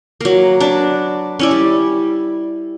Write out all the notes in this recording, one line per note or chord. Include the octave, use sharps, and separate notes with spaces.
F#3 A#3
D4 B4 D5
C#4 E4 D5
G3